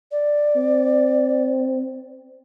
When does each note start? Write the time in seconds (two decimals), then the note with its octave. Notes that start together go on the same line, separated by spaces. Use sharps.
0.12 D5
0.56 C4